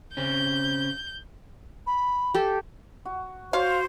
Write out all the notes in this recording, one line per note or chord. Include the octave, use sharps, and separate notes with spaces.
C#3 C4 C#4 G6
B5
G4 A4
F#4
F#4 C5 C#5 F5 C6